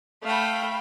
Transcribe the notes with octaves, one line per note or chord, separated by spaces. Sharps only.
A3 F5 G5 B5